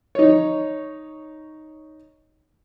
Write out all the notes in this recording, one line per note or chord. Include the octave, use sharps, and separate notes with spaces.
D#4 C#5